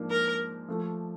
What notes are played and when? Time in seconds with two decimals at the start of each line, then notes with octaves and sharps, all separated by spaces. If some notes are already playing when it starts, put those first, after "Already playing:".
Already playing: G#2 F3 A#3 D4
0.10 A#4
0.68 F3 A3